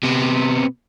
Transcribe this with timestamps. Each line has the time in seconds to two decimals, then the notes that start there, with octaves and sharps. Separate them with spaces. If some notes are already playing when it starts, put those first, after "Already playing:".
0.03 C3 B3